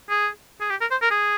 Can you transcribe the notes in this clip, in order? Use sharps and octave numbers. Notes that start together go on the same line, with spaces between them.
G#4
G#4
G4
A#4
C5
A#4
G#4